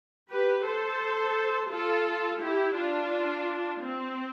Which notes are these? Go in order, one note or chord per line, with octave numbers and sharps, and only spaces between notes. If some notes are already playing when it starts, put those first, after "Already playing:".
G4 B4
A4 C5
F4 A4
E4 G4
D4 F4
C4